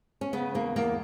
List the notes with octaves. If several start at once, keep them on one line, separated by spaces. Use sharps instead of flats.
C#4
C#3 B3
E2 A#3
E2 A#3